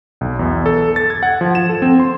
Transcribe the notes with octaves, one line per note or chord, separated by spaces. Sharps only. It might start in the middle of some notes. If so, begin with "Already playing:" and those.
B1
E2
A4
A6
G#6
F#5
F3
E7
A4
C4
C6